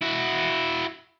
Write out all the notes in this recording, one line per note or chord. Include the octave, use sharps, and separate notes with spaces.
E4 F#4